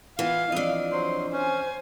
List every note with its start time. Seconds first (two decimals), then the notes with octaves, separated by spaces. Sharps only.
0.19 E3 B3 F4 F5
0.52 E3 F3 C4 D4 D#5
0.92 F#3 C5 C6
1.32 C#4 C5 G#5